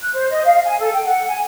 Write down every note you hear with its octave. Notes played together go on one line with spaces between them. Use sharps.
F#6
C5
D#5
F5
G#5
A4
G5
F#5
G#5